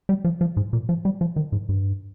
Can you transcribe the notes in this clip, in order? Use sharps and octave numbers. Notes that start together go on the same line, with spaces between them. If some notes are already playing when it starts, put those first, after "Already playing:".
G3
F3
F3
G#2
A#2
F3
G3
F3
D#3
G#2
G2